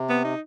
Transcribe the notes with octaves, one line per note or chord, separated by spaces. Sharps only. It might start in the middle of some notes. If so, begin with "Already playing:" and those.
Already playing: C3
B3
D#4